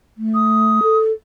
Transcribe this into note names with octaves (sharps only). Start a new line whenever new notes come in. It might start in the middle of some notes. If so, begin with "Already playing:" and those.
A3
D#6
A4